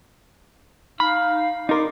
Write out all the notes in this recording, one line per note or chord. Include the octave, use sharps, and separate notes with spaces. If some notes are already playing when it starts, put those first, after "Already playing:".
D#4 F5 B5
D#4 A#4 D5 C6 D6